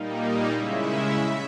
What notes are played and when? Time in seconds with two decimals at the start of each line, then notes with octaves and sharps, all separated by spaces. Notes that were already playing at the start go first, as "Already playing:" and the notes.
Already playing: A#2 G3 A#3 D#4
0.52 C#3 G#3 C#4 E4 E5